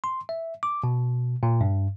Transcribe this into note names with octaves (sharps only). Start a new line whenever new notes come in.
C6
E5
D6
B2
A#2
G2